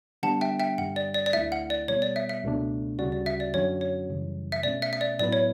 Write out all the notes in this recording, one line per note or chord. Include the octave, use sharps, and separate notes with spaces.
D3 G3 B3 D4 F#5 A5
E5 G5
E5 G5
G2 D3 G3 F#5
D5
D5
D5
D2 D3 A3 E4 E5
F#5
D5
B2 G3 B3 C#5
D5
E5
E5
C#2 B2 A3 D4
D2 C#3 G3 C#4 F#4 D5
D5
E5
D5
F#2 D3 F#3 C#4 F#4 C#5
C#5
F#2 C#3 E3 G3
E5
B2 A3 C#4 D5
E5
E5
D5
A2 F#3 B3 E4 B4 D5
C#5